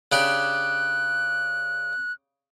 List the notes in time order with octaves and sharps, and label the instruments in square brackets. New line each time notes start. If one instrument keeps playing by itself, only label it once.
[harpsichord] C#3 D4 G4 [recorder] F#6